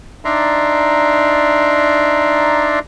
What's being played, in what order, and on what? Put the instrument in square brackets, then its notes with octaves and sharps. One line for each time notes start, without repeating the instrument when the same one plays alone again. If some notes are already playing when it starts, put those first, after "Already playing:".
[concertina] D4 D#4 D5 E5 A#5 C6